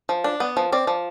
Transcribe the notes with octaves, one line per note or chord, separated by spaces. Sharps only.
F3
D4
B3
F3
C4 D5
F3